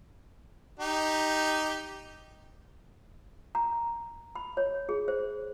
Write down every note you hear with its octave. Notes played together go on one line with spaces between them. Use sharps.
D#4 G4
A#5
B5
C#5
G#4
C5